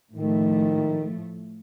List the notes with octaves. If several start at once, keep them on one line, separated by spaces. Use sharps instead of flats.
A2 D#3 F3 A3